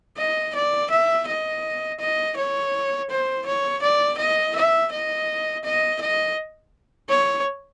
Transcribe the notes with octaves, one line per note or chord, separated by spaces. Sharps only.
D#5
D5
E5
D#5
D#5
C#5
C5
C#5
D5
D#5
E5
D#5
D#5
D#5
C#5